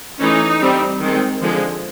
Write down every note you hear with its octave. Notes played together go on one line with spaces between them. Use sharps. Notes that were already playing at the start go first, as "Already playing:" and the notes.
E3 A3 C#4 D#4
G3 C4
D#3 G#3 C4
D3 F3 G#3